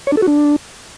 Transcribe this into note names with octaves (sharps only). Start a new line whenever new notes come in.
C#5
D4
A4
F#4
D4